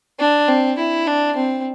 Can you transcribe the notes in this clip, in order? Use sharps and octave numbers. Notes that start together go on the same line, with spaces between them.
D4
C4
E4
D4
C4